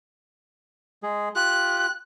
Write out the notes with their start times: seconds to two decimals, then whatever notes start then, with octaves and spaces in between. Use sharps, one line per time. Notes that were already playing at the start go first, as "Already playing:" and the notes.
1.03 G#3 G#4
1.36 F4 G4 F#6